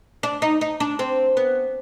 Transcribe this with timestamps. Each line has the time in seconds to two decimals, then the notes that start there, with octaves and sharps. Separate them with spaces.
0.23 D4
0.42 D#4
0.61 D#4
0.80 D4
0.99 C4
1.37 B3